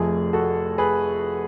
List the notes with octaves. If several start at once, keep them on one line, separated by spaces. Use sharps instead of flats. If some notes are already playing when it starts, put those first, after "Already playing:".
Already playing: F1 F2 F3 A3 G#4
F#4 A4
G#4 B4